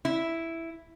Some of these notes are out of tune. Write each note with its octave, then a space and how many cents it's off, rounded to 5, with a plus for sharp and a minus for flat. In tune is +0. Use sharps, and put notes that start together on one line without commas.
E4 +0